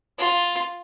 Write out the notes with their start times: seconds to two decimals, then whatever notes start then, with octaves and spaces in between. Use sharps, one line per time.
0.18 F4